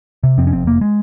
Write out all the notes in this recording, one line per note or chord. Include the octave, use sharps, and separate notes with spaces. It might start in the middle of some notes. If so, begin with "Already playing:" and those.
C3
F2 C4
C#4
F1 C4
F1 A#3
G#3